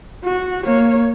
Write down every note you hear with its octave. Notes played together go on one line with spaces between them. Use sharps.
F#4
A#3 C#5